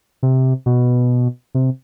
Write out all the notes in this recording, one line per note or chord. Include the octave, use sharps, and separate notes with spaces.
C3
B2
C3